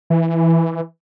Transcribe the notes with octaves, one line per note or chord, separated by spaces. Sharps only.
E3